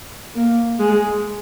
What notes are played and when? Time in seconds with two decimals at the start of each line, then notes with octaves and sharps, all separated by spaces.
0.35 A#3
0.79 G#3